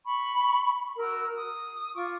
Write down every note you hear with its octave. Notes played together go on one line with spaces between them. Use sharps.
B5 C#6
F#4 A#4 E6
D#6
F4 C#6 D6